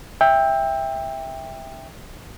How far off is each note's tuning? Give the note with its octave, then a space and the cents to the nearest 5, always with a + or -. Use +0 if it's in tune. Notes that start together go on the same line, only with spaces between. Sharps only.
E5 -10 G5 +20